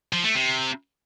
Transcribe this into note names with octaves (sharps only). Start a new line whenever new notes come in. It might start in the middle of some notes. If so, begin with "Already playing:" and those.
F3
A3
C3